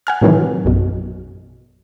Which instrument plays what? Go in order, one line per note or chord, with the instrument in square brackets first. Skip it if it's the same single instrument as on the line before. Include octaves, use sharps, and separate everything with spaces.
[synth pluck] F#5 G#5 F6
A2 C3 D#3 E3 F#3
A#1 F#2 B2